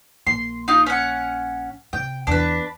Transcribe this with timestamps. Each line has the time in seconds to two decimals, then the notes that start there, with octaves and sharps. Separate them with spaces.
0.27 A#1 C6
0.68 D#4 F4
0.86 C#4 F#5
1.93 C3 G5
2.27 E2 D4 B4